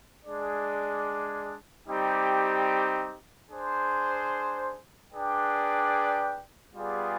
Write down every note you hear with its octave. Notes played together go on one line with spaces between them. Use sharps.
G#3 D4 G#4 D5
G3 C4 D#4 G4
D4 G#4 C5
D4 G#4 B4 D5 G5
G3 B3 F4 G#4 D5